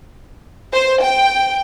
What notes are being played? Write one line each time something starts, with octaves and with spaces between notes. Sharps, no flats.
C5
G5